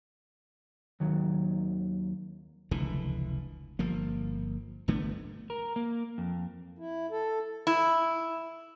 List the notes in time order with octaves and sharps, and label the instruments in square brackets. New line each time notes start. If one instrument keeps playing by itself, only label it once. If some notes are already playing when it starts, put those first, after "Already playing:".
[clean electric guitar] D#2 D#3 F#3
[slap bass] F1 C#2 D3 E3
G1 F3 A#3
G1 D3 A3 B3
[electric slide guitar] A#4
A#3
F2
[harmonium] E4
A4
[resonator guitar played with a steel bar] E4